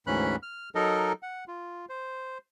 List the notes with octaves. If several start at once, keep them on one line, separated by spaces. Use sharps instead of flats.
D2 G#2 E3 C#4 B5 F#6
F6
F#3 D#4 A4 A#4 D#5
F#5
F4
C5